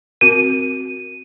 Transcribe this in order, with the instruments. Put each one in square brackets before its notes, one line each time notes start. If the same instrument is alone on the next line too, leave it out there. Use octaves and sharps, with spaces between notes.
[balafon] C4 F#4 A#4 [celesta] D#7